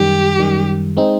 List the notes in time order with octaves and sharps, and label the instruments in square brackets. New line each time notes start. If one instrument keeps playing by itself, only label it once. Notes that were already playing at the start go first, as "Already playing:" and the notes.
Already playing: [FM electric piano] F#2 D#3 G3 [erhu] G4
[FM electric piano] F#2 D#3 G3
G#3 C4 D#4